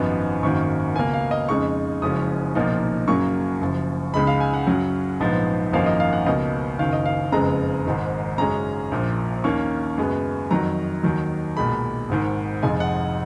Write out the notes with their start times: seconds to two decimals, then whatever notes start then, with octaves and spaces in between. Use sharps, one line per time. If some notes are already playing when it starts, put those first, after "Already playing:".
Already playing: G#1 F#2 F3 B3 D#4
0.42 G#1 F#2 D#3 A#3 C#6
0.96 C#2 B2 A#3 G#5
1.14 F5
1.31 D#5
1.49 F2 C#3 G#3 D#4 C#6
2.02 F#1 F#2 F3 G#3 C#4 D#6
2.55 B1 A#2 F3 A#3 D#4
3.08 F#2 C#3 F#3 A#3 C#6
3.61 F#1 F#2 F3
4.14 C#2 C#3 G#3 D#4 B5
4.27 F5
4.40 G#5
4.53 F#5
4.67 F#2 C#3 F#3 C#4
5.20 A#1 G#2 F3 B3 D#4
5.73 G#1 F#2 F3 A#3 D#4 F5
5.86 D#5
6.00 F5
6.13 F#5
6.26 C#2 B2 A#3 D#5
6.79 F#1 F#2 D#3 F5
6.93 D#5
7.06 F5
7.32 F#1 F2 C#3 G#3 B3 A#5
7.86 G#1 G#2 D#3
8.38 F#2 C#3 G#3 C#4 A#5
8.91 A#1 A#2 F3
9.44 D#2 D#3 A#3 C#4 C#6
9.98 F#2 C#3 G#3 B3
10.51 F2 D#3 F#3 A#5
11.03 D#2 D#3 F#3
11.57 B1 A#2 G#3 B5
12.09 G#1 G#2 D#3
12.63 F1 F2 F3 G#3 D#4 G#5
12.80 F#5